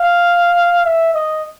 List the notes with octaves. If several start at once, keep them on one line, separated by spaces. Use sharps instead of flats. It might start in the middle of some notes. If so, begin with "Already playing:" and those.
Already playing: F5
E5
D#5